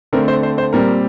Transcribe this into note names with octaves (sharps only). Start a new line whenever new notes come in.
D3 A3 C4 A#4
C5
C5
C5
A#2 G3 C4 A#4